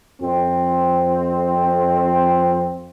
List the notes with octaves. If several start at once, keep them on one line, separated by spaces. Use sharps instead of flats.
F2 C4